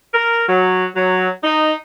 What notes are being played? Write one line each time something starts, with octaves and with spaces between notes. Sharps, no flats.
A#4
F#3
F#3
D#4